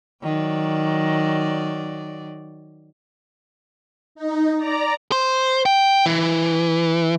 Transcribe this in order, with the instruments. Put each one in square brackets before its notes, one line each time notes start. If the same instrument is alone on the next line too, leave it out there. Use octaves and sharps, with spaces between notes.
[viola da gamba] D#3 F#3 D5
[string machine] D#4
D5 A#5
[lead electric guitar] C5
G5
E3